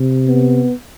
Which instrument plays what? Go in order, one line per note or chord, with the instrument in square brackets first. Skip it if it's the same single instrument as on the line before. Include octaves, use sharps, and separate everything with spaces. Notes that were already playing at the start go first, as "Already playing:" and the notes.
Already playing: [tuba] C3
[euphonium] B3